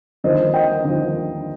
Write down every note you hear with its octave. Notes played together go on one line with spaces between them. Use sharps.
D#2 D3 F3 C5 D#5
D#5 G5
D#2 D3 F3